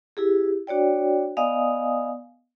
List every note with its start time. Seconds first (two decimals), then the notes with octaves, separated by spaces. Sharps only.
0.17 E4 G4 G#4
0.67 D4 F#4 C#5 D5 G5
1.37 B3 D5 D#5 F5 G#5 D#6